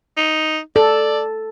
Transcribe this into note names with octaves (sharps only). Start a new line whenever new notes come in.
D#4
A4 D5